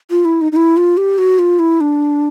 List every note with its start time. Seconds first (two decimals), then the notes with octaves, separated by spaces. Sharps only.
0.11 F4
0.25 E4
0.41 D#4
0.52 D#4
0.56 E4
0.77 F4
0.97 G4
1.18 F#4
1.39 F4
1.59 E4
1.81 D4